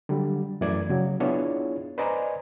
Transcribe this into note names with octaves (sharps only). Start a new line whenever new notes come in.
D3 F#3 G3
F#2 E3 A3 D5 G#6
C#3 F#3
B3 D4 E4 F4 G#4 C#5
B4 C5 D5 D#5 G#5 A#5